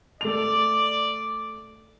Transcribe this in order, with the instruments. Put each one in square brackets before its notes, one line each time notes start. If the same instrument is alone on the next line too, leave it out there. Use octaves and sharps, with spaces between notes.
[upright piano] A3 F7 [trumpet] D5